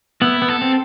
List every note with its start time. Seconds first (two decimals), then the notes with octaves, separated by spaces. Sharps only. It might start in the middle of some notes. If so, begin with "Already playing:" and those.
0.21 B3 E4
0.42 B3
0.49 A4
0.62 C4